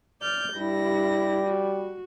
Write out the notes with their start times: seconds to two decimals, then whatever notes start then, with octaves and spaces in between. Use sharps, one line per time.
0.21 D5 F6 G6
0.55 G2 G3 E4 A#6
1.47 F#4